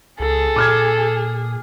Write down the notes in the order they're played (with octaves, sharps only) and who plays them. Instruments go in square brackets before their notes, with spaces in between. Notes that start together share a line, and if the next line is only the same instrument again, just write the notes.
[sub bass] C#2 [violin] G#4 [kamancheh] A4
[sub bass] A#2 [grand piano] D6 F6 G#6